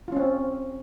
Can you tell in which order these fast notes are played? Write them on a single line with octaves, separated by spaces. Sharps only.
F4 C#4 C4